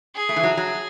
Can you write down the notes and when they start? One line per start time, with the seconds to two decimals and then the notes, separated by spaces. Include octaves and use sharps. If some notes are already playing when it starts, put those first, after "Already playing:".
0.15 G#4
0.29 A3
0.36 E3
0.43 F#3
0.57 F#3